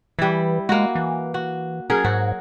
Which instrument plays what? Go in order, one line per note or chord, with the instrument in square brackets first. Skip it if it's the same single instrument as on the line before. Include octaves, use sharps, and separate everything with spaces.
[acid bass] E3 [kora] G3 E4
[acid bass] G#3 [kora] A#3 F#4
[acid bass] E3
[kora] F#4
[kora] F#3 G#4 A#4 [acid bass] C#4
[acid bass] G#2 [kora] F#4